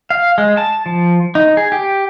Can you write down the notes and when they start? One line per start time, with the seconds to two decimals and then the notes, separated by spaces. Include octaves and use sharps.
0.10 F5
0.38 G#3
0.57 A5
0.86 F3
1.35 D#4
1.57 G#4
1.72 G4